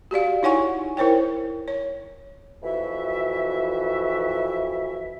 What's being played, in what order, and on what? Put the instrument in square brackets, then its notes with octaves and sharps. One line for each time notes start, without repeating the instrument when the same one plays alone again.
[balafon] F#4 G4 D5 F5
D#4 E4 C#5 F#5 G#5 C#6
E4 A#4 C5 C#5 G5
C#5
[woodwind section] F2 E3 F#4 E5